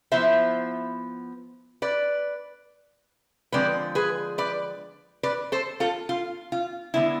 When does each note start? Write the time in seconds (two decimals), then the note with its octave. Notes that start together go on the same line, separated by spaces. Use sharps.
0.12 F3 B3 E4 C5 E5
1.82 B4 D5
3.52 D3 F3 G#3 C4 B4 D5
3.95 G#4 B4
4.38 B4 D5
5.23 B4 D5
5.52 A4 C5
5.80 F4 A4
6.09 F4
6.52 F4
6.94 D3 G#3 B3 D4 E4